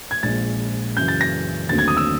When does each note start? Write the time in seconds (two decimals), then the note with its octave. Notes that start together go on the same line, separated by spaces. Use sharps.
0.11 G#6
0.23 A#1 A#2 F3 G#3 A6
0.97 F#2 C#3 E3 G6
1.08 A6
1.21 A#6
1.69 D#2 D3 F#3 A3 C4 A6
1.78 G#6
1.88 D#6
1.97 E6